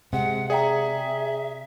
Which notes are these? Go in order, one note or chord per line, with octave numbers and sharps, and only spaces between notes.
C3 G#3 F#5
G#4 D5 E5 G5 A#5